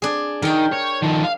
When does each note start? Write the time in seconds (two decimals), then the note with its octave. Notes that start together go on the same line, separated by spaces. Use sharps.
0.02 D4 G#4
0.42 D#3 A#4 G5
0.72 C#5
1.02 D#3 F3
1.23 F5